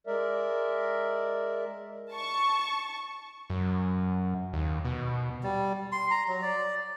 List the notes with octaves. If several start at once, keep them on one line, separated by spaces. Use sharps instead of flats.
G#3 A#4 D5 E5
A5 C#6
F#2
D#2
B2
G3
C6
A#5
F#3
D5